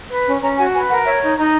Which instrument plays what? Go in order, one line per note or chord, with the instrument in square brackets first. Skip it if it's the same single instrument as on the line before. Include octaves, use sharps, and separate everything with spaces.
[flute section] B4
C#4
C#4 A#5
F#4 G#5
B4 G#5
A#4 F#5
C#5 E5
D#4
D#4 A#5